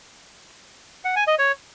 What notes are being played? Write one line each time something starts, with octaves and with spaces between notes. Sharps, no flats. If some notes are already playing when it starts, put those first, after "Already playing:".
F#5
G#5
D#5
C#5